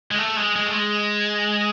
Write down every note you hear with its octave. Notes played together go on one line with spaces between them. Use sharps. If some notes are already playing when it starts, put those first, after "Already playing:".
G#3
A3
G#3
G#3
A3
G#3